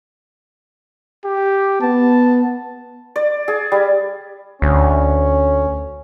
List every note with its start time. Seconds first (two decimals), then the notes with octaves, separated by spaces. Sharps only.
1.25 G4
1.81 B3 A5
3.16 D5
3.48 G#4
3.72 G3
4.62 D2 C#4